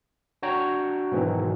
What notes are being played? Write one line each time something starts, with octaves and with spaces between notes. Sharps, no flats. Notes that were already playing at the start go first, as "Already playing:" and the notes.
D4 F#4 C#5 G5 A#5
G#2 B2 D#3 E3 F#3